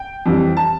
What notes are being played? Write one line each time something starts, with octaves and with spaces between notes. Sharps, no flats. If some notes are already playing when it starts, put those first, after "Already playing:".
Already playing: G5
F2 E3 G3
A5